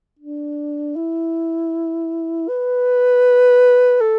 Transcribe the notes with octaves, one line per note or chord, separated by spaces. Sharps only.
D4
E4
B4
A4